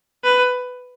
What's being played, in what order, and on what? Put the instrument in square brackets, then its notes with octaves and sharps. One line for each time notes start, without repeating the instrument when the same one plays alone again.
[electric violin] B4